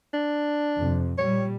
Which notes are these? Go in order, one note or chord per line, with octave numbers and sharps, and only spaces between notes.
D4
F2 C3
A#2 G3 C#5